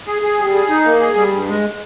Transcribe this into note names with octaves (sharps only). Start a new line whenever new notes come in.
G#4
G#4
G3
G#4
D#4
A#3
G#4
G3
G2
G#3